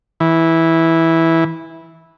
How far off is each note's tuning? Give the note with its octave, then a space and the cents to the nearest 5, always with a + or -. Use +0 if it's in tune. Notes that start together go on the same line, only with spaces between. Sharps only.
E3 -10